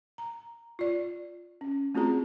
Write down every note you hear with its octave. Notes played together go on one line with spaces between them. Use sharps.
A#5
F4 D5
C#4
A3 C4 F4 F#4 G#4 A#5